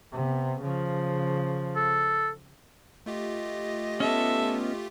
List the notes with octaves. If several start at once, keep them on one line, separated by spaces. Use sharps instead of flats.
C3 B3
C#3 F3
A4
A3 F4 G4 D#5
B3 C#4 A4 E5